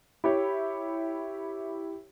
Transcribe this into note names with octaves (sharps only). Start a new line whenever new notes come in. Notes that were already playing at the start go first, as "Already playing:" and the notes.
E4 G4 C#5